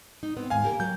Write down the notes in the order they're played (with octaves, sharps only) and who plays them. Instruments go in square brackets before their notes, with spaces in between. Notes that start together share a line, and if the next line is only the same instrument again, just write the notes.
[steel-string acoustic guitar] D#4
B3 C4
[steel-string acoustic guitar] D#2 G#2 [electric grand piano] F5 G#5
[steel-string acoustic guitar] A#3 G4 A#4
[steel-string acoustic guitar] F#3 [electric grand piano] G6